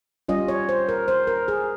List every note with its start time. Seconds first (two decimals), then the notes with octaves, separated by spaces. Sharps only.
0.28 G3 C#4 F4 D#5
0.48 C#5
0.69 C5
0.89 A#4
1.08 C5
1.27 A#4
1.48 G#4